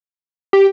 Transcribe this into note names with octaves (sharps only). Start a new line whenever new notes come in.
G4